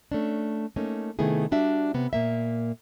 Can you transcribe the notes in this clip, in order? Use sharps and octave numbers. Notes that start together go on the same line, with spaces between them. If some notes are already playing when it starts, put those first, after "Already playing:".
A3 C#4 D4
A3 A#3 C#4 D#4
C3 D#3 A3 B3 E4 G#4
G3 D4 F#4 E5
C3 B3
A#2 A#3 E5